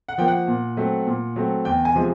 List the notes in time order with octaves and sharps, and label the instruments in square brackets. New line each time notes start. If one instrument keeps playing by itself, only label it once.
[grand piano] F#5
F3 A#3 G5
F#5
A#2
F#3 A3 C4
A#2
F#3 A3 C4
E2 G5
G#5
C3 F3 G#3